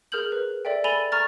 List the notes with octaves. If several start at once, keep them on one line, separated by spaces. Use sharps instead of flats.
G#4 A#4 F6 G6 F#7
B4
A4 D5 E5 G5
A4 G#5 B5 A6 F7 G7
A#5 C#6 F6 A6